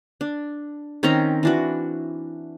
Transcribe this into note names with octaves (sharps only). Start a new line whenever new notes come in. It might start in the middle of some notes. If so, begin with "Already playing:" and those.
D4
D#3 C4 C#4 A#5
E3 D4 F#4